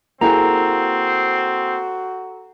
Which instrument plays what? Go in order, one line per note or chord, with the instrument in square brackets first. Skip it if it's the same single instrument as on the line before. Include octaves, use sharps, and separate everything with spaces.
[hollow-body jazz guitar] A#3 E4 G#4 [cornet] C4 [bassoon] F#4 [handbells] A4 A#5